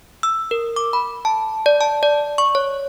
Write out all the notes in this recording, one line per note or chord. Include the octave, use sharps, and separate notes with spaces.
E6
A#4
D6
B5
A5
D5
A5
D5
C#6
C#5